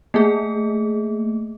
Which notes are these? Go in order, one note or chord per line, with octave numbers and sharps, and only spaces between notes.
A3 A#3 G#4